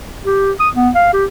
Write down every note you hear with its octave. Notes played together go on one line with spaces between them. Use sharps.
G4
D#6
B3
F5
G4